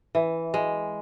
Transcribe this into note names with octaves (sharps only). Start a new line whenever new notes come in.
E3
G#3